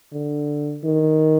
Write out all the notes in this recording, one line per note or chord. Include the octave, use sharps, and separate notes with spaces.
D3
D#3